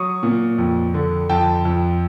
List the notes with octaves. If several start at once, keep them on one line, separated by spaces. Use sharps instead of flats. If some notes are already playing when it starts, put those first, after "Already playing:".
Already playing: F#3 C#6 D#6
A#2
F2
D3
F2 G5 A5
F2